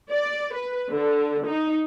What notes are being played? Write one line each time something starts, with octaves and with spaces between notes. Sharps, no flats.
D5
B4
D3
D#4